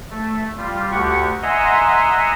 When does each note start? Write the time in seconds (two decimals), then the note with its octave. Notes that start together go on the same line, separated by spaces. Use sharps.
0.10 A3
0.57 G3 F4
0.92 D2 G4 F#5 C#6
1.43 D#5 E5 F#5 G#5 A#5 C6